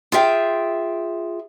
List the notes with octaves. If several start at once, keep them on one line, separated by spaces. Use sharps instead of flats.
F4 G#4 E5 G5